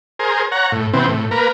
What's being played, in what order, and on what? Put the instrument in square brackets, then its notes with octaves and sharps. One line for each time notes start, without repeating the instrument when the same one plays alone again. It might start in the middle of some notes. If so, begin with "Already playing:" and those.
[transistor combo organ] G#4 A#4 C5
C#5 F#5 A#5
A2
C3 E3 B3 C4
A2
A#3 A#4 B4